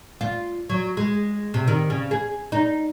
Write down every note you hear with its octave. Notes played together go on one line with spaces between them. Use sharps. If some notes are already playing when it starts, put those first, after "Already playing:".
F4
F#3
G#3
C3
D#3
C#3
G#4
D#4